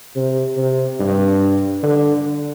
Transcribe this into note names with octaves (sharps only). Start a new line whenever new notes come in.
C3
C3
G2
D3